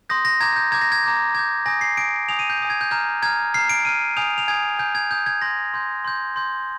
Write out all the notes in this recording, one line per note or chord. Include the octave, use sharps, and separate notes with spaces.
C6 D#6 G6 A#6
A#6
A#5 D6 G6 G#6
G6
A#5 D6 G6 G#6
A#6
G#6
A#5 D6 G6
A#5 D6 G6 G#6
G#5 D#6 G6 A#6
C7
G#5 D#6 G6 D7
G#5 D#6 G6 F7
D#7
G6
G#5 D#6 G6
G#6
G6
A#5 F6 G6
A#5 F6 G#6
A#5 F6 C7
D7
A#5 F6 D#7
G#5 D#6 G6 F7
F7
G#5 D#6 G6 G#6
G#5 D#6 G6
G#6
G#5 D#6 G6
G#6
C6 G6 A#6
C6 G6
C6 G6
C6 G6